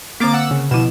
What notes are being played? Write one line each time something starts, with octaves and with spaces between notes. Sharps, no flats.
D3 A#3 C4 D6 A6
F#5 E6
C#3
B2 F3 E4 E7